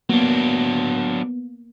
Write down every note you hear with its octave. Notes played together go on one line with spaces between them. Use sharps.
F#3 A#3 B3 D4